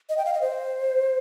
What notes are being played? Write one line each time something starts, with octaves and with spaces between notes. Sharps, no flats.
D#5
G5
F5
D#5
C5